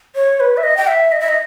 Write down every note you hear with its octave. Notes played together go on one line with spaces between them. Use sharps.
C#5
B4
E5
D#5
G5
E5
D#5
E5
D#5